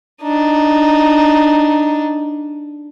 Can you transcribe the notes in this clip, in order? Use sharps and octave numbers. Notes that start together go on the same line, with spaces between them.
D4 D#4